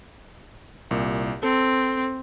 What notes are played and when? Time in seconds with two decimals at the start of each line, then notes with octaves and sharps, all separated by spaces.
0.91 C2 A#2
1.43 C4 A4